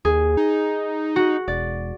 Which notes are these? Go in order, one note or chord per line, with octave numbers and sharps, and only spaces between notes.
D#2 G#4
D#4
F#4
E1 D5